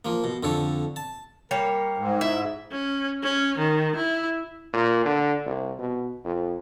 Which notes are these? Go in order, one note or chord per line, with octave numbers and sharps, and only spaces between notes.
F3 A#3
B2
F2 D3 A4 C#5
A5
G3 A#3 A#4 C#5
G#2
E4 E5
C#4
C#4
D#3
E4
A#2
D3
C2
B2
F2